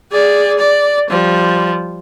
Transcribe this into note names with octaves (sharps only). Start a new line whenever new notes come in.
G#4 D5
D5
F3 G3